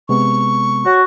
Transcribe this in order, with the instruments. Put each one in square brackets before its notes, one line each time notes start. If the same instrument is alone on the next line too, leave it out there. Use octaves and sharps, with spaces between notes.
[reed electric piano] C3 G#3 B3 [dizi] C#6
[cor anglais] F#4 [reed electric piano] C#5